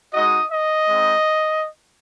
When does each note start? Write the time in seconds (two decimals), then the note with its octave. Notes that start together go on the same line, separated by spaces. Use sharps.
0.13 G#3 D#4 F#4 D#5
0.50 D#5
0.88 G#3 C4 D#4